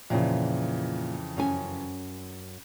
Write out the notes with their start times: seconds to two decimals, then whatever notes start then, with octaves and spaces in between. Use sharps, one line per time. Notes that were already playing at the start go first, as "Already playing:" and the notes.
0.10 F2 A#2 C#3 E3
1.37 F#2 C#4 G#5